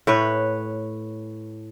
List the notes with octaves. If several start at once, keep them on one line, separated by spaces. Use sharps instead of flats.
A2 B4 C#5